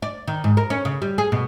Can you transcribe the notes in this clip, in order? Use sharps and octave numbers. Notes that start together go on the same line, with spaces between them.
D5
D#3
G#2
A#4
C#4
C#3
G3
G#4
B2